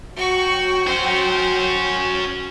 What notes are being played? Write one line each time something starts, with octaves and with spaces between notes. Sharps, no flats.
F#3 F#4 G5 C#6
C#4 F#4 C5